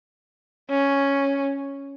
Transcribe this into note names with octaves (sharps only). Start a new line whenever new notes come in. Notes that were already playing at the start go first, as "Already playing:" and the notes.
C#4